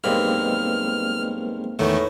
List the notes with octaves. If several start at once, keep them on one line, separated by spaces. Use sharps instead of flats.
B1 G2 G#3 A#3 C4 B5 F6
E2 A2 D#3 E3 A3 F#4